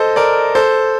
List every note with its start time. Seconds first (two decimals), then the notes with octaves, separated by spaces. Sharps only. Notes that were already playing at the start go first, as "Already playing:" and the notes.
Already playing: A4 C5 D#5
0.16 A#4 D5
0.55 A4 C5